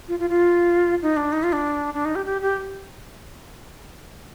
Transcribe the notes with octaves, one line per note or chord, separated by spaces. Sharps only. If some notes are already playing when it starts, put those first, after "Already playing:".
F4
F4
F4
D#4
D4
D#4
F4
D4
D4
D#4
G4
G4
G4